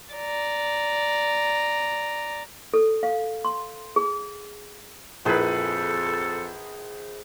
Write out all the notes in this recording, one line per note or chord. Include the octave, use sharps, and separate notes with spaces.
D5 A#5
A4
F5
C6
G#4
A#1 F2 E4 G#4 A4 B4 C5